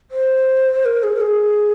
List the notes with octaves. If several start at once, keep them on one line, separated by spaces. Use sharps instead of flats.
C5
A#4
G#4
A#4
G#4